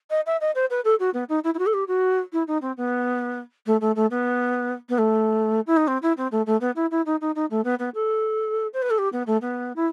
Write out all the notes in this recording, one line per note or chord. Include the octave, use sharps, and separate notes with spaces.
D#5
E5
D#5
C5
B4
A4
F#4
B3
D#4
E4
E4
F#4
A4
G4
F#4
E4
D#4
C4
B3
A3
A3
A3
B3
B3
A3
E4
D#4
C4
E4
C4
A3
A3
B3
E4
E4
D#4
D#4
D#4
A3
B3
B3
A4
C5
B4
A4
G4
B3
A3
B3
E4